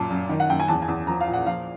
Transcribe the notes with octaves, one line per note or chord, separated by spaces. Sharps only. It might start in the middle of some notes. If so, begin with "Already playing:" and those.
Already playing: F#2 A#2 A5
F#2
D#3
F#5
F#2 G5
G#5
E2 A5
G#5
E2
F3 A#5
F5
A#2
F#5
F3 F5